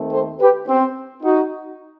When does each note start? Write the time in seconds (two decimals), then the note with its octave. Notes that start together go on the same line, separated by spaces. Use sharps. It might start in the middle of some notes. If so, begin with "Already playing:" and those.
Already playing: D#2 D#3 A3 C4
0.11 A4 C5
0.40 G4 B4
0.67 C4
1.23 D#4 F#4